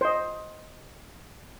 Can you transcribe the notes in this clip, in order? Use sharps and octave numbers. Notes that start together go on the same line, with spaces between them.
C5 D#5